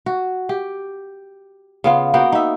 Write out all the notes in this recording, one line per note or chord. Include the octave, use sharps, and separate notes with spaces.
F#4
G4
C#3 B3 F4
A#3 B3 F#4 G5
D#4 E5